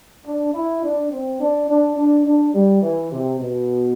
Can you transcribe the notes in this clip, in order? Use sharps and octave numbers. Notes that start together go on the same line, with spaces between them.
D4
E4
D4
C4
D4
D4
D4
D4
G3
E3
C3
B2